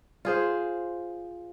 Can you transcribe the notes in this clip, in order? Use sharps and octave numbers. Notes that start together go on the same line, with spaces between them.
F4 G#4 C5